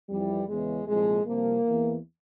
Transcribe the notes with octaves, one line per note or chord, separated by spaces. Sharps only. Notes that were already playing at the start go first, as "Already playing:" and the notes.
F2 E3 G3
E2 C#3 E3 G#3
C2 A#2 F3 G#3
C2 C3 F3 A#3
E2 E3